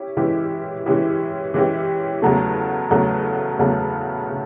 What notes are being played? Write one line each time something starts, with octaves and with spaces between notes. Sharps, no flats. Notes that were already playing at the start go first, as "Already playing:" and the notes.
Already playing: C#4 E4 G4
E3 G#3 C#4 E4 G4
E3 G#3 C#4 E4 G4
E3 G#3 C#4 E4 G4
E2 C#3 F#3 A3
E2 C#3 F#3 A3
E2 C#3 F#3 A3
C#3